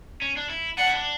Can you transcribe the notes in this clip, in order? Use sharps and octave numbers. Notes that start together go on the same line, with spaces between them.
C#4
D4
E4
D4 F#5
E4
D4